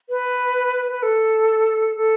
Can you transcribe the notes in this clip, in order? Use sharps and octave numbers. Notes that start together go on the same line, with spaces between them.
B4
B4
A4
A4